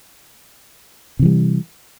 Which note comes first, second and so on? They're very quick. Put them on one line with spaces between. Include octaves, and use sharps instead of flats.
C3 E3 G3